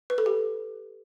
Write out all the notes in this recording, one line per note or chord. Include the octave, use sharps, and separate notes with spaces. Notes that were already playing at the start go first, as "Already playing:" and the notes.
B4
A4
G4